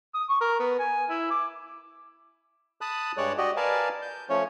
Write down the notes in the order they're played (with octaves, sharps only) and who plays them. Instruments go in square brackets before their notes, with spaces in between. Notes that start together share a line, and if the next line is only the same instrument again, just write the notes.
[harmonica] D#6
C#6
A#4
B3
G#5
E4
D6
[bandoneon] A5 B5 D#6 F#6
G2 G3 G#3 C#5 D5 F#6
F#4 G4 D5 D#5
A#4 B4 D5 F5 G#5 A5
G6
F3 A3 C#4 C#5